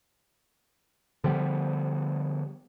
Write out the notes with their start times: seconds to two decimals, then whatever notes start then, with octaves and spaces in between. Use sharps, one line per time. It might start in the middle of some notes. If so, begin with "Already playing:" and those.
1.24 D3 F3 G3 B3